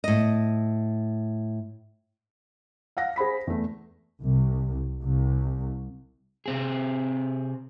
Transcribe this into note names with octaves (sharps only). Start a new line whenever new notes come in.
A2 D#5
F5 F#5 A#6
G#4 C5 B5 B6
E2 A3
C2
C2
C3 C4 G#4